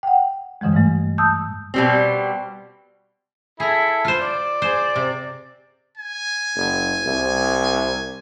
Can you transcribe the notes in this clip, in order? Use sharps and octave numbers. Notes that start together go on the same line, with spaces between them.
F#5 G5
G2 D3 E3 G3 G#3
G#2 E3 A3
A5 D#6 E6 G6
B2 G3 C4
E4 G#4 A4 A#5
F4 C5
D5
G#4 C5
C3
G#5
F#1
C2